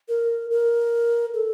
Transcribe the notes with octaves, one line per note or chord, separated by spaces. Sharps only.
A#4
A#4
A4